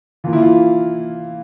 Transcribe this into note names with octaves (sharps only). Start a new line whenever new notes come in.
E3 A#3 F4
E4
F4